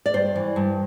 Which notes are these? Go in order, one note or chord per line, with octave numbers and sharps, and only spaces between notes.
D5
G2 C5
E3
G2